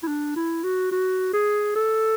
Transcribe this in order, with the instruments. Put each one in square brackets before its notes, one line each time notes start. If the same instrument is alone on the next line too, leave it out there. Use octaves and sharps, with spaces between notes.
[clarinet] E4
D4
E4
F#4
F#4
G#4
A4